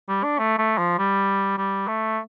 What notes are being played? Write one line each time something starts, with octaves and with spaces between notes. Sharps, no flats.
G3
D4
A3
A3
F3
G3
G3
A3